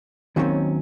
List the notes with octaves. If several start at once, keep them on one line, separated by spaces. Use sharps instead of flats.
D#2 D#3 F#3 A3 C4 C#4